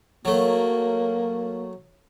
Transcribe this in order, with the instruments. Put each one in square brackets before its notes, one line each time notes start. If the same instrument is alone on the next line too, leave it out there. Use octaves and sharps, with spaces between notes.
[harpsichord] F#3 A3 [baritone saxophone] A#3